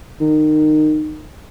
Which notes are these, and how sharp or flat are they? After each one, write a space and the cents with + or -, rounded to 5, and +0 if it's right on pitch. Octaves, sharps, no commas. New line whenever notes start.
D#3 -25